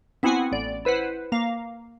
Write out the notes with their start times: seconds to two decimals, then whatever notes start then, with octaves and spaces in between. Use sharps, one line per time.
0.23 B3 C4 E4 F#4 F#5 G#5
0.52 A1 D5
0.85 E4 B4 C5 F#5
1.32 A#3 F5